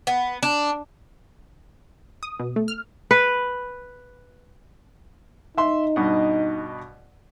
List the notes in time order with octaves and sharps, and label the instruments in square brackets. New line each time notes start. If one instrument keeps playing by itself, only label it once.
[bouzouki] B3
D4
[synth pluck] D#6
B2
A3
F6
[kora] B4
[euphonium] D#4 [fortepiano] E5 C6
[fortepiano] G2 B2 D#5